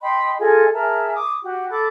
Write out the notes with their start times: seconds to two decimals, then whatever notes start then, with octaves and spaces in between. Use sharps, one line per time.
0.01 D#5 G5 B5 C6
0.39 F4 G#4 A4 D#5
0.73 G#4 A#4 E5 A5
1.11 D6 D#6
1.42 F#4 G4
1.69 A4 B5 D6